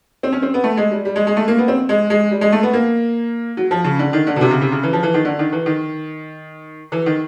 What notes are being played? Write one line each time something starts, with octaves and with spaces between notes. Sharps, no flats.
C4
C#4
C4
B3
A3
G#3
G3
G3
G#3
G#3
A3
A#3
B3
C4
G#3
G#3
G3
G#3
A3
B3
A#3
F#3
F3
C#3
D3
D#3
D3
B2
C3
C#3
C3
C#3
E3
F3
E3
D#3
D3
D#3
E3
D#3
E3
D#3